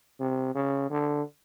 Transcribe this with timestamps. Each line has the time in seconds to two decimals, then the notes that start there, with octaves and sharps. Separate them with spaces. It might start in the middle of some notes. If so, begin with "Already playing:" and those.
0.20 C3
0.55 C#3
0.91 D3